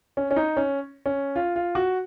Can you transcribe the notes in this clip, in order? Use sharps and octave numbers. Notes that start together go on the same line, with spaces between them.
C#4
C#4
D#4
C#4
C#4
F4
F4
F#4